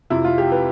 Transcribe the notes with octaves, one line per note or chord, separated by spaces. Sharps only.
F2 C3 F3 E4
F4
G4
B4